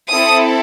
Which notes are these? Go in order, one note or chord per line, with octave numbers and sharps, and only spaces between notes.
C4 E4 A4 D#6